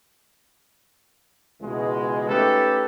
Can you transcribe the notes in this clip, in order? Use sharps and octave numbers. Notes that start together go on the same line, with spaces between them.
C#2 B2 E3 G#3
A3 C#4 D#4 G4 A4 B4